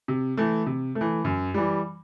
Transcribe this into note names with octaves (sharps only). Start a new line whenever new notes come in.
C3
E3 A3
C3
A3
E3
F#2
E3 G3